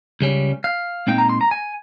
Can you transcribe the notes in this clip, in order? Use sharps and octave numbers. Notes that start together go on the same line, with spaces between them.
C#2 C#3 G3 C#4
F5
A#2 G#3 C4 D#4 G5
A#5
C6
A#5
G#5